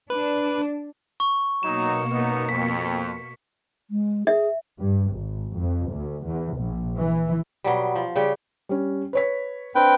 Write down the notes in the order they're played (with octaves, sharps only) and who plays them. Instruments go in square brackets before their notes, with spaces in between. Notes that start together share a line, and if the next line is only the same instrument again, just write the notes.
[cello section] D4 [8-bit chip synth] B4
[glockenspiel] C#6
[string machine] B2 A#3 C#7 [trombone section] F#3 D#4 [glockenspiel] E7
[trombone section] F#2 B3 D#4
[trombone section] F2 [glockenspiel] B6
[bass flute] G#3
[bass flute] G#4 [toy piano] E5
[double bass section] G2
G#1
F2
D2
E2
A#1
E3
[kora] B2 F#3 G3
F3
C#3 G3 G4
[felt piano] G3 C#4
B4 C#5 B6
[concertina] C4 B4 G5 [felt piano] D4